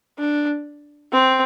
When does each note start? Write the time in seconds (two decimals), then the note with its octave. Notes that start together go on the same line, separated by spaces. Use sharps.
0.18 D4
1.12 C4